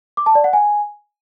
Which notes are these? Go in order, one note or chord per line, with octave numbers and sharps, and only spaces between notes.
D6
A5
D5
F#5
G#5